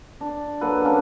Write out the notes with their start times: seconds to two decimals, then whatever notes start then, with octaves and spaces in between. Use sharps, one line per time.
0.21 D4 D5
0.61 F#3 A#3 A4 B4
0.85 A#3 C#4 D4